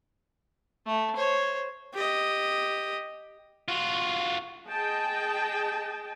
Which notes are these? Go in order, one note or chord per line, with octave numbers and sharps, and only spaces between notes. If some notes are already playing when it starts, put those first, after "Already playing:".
A3
C5 C#5
G4 D#5
F4 F#4
G#4 D#5 G5 A5